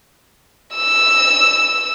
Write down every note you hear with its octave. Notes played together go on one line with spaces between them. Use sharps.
E6